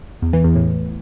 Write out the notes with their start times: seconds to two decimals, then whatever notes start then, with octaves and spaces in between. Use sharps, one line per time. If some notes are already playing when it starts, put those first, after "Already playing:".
0.22 E2
0.33 E3
0.44 E2
0.55 A2